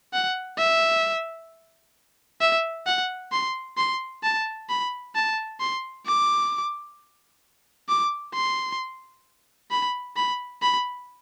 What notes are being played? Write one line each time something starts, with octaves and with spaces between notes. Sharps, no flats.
F#5
E5
E5
F#5
C6
C6
A5
B5
A5
C6
D6
D6
C6
B5
B5
B5